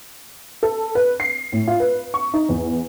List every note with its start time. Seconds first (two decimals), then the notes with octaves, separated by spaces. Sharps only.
0.63 A4
0.95 B4
1.20 C7
1.52 A2
1.67 F4
1.80 B4
2.14 C#6
2.34 D#4
2.49 E2